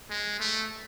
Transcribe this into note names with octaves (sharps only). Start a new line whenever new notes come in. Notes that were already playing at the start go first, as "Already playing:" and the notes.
G#3
A3